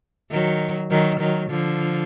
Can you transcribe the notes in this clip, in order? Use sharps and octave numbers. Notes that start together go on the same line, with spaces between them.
D#3 F#3
D#3 F#3
D#3 F#3
D3 F3